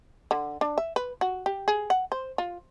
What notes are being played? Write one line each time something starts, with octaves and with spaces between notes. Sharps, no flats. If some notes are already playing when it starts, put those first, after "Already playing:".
D3
D4
E5
B4
F#4
G4
G#4
F#5
C5
F4